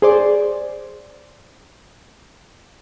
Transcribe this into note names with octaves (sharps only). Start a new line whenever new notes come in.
G#4 C5 D5